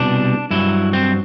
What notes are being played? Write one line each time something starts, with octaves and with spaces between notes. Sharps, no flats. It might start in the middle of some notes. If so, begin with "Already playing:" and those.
Already playing: C2 B2 G3 D4
G2 F#3 E4
C4